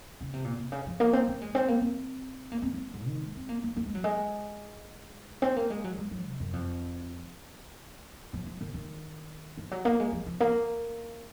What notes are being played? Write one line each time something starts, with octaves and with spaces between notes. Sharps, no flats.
C#3
C3
A#2
C3
C#3
F3
A#3
C4
A#3
G#3
C4
A#3
C4
A#3
C4
A#3
D#3
G#2
D#3
G#3
C4
A#3
A#3
A#3
G#3
F#3
G#3
C4
A#3
G#3
F#3
G#3
F#3
C3
F#2
F2
F3
F3
D#3
D#3
F3
F#3
A#3
G#3
F3
F3
A#3